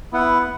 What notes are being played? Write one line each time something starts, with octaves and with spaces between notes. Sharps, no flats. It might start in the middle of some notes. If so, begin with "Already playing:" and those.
B3 E4 B4 F#5